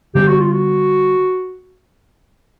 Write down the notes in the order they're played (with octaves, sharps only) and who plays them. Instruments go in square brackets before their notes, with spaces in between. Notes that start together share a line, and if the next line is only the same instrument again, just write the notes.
[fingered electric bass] D3 G3 B3 D4 [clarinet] G4
[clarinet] F#4
F4
F#4